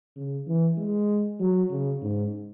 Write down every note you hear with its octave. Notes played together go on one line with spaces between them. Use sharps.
C#3
E3
G#3
F#3
C#3
G#2